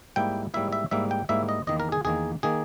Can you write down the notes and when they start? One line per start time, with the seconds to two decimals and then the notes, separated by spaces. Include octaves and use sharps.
0.16 G#2 G3 A#3 E4 G5
0.54 G#2 G3 A#3 E4 E5
0.72 E5
0.91 G#2 G3 A#3 E4 E5
1.11 G5
1.29 G#2 G3 A#3 E4 E5
1.49 D#5
1.67 E2 D#3 A#3 D#5
1.80 A#4
1.92 G#4
2.05 E2 D#3 A#3 G#4
2.43 D#3 A#3 G#4